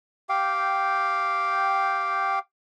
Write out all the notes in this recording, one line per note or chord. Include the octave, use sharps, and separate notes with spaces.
G4 F5 G5